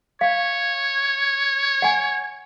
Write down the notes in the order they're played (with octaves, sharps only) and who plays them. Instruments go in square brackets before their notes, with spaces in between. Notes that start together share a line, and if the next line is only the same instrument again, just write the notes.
[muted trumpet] C#5 [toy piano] F5
[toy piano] F#5 G#5